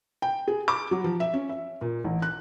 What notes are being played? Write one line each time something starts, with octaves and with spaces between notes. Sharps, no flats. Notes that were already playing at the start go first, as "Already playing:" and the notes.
G5
G#4
D6
F#3
F3
E5
C#4
E5
A#2
A1
F#6